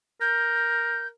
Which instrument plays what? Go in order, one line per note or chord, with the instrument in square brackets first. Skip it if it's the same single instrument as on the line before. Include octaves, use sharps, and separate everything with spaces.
[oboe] A#4 [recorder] G6